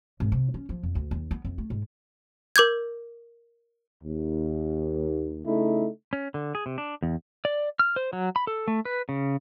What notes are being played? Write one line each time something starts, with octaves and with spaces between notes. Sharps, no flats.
G#1
C3
C#4
F3
F2
D2
D#2
B3
F2
A3
G#2
A#4 D6 G6 G#6
D#2
C#3 A3 D#4 E4
C#4
D3
G#4
C3
D4
E2
D5
F6
C5
F#3
B5
A4
A3
B4
C#3